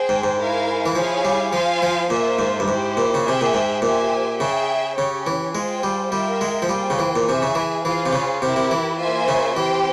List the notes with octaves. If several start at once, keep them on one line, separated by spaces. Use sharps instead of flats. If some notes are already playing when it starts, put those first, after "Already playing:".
Already playing: G#4 C5 G5
G#2
G#2
E4 A#4 F5 G#5
E3
F3 E4 G#4 C#5 F5 G#5
G3
F3 F4 C5 F5 G#5
F3
A#2 A#3 F4 C5 E5
G#2
G2
G#2 E4 G4 C5
A#2
C#3
C3 G#4 E5 G5
A#2
G#2
A#2 G4 C5 E5 G#5
C#3 G#4 E5 G5
C#3 C#4 G4 C#5
E3
G#3 F4 G#4 C5 G5
G3
G3 F4 A#4 E5 G5
G#3
F3
G3 A#3 F4 G#4 C5 G5
C#3
E3
A#2
C3 G#4 E5 G#5
C#3
E3
E3 F4 G#4 C5 F5
C3
C#3
C3 E4 G4 A#4
C3
E3
A#3 F4 C5 E5 G#5
C#3
E3 C4 G4 C5 G5